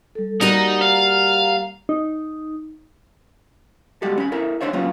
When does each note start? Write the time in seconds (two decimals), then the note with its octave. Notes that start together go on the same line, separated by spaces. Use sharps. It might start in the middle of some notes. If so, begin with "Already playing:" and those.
0.15 G3 A4
0.41 G3 A#3 D#4 F#4 A#5
0.82 F5
1.89 D#4
4.02 G3 G#3 F#4 G4 A4
4.18 C#4 B5
4.32 E4 A4 A#4 E5
4.61 D4 D#4 C5 C#5 E5
4.73 F#3 A#3 B3 C#4 F4